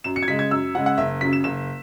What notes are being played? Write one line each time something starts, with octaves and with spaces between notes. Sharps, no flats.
F#2 E7
C#7
G#6
C#3 G#3 B6
G#6
F#2 E6
C#3 G#3 F#5
F#5
F#1 E5
F#2 C#3 B6
E7
F#1 E7